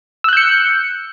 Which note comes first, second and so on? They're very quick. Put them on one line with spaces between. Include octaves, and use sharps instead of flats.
E6 F#6 G6 C#7